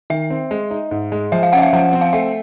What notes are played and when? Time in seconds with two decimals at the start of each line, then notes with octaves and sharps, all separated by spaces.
0.10 D#3 E5
0.30 C4
0.51 G#3
0.71 D#4
0.91 G#2
1.12 G#3
1.32 F3 E5
1.43 F5
1.53 C#4 F#5
1.58 E5
1.62 F5
1.73 F3 F#5
1.93 C4
2.01 F5
2.13 A3 E5